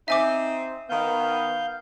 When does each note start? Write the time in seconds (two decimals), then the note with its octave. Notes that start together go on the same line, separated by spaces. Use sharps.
0.08 C4 D#4 E5 G#5 D6
0.90 D#3 B3 F5 G6